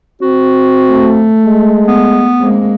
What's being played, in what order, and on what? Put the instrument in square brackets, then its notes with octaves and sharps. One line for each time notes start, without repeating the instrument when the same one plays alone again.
[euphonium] C4 [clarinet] F#4
[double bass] A3
[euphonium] G#3
[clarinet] B3
[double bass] G#3 A#3 [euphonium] C4